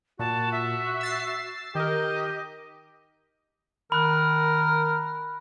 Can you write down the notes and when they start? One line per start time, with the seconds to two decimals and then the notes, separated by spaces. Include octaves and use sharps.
0.19 A#2 F#4 A5
0.52 E5
1.01 E6 A6 C7
1.75 D#3 G4 A#4 D#5
3.92 D#3 A#4 B5 F#6